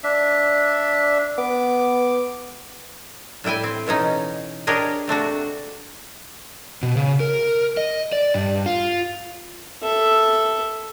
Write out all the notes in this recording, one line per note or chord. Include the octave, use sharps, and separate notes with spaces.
D4 E5
B3 D6
A2 G3 E4 G5 G#5
C4
B2 E3 C#4 D#4
D4 G4 G#4 A#4 C#5 D#5
C3 A3 D4 F#4
B2
C#3
A#4
D#5
D5
G2
F4
A4 E5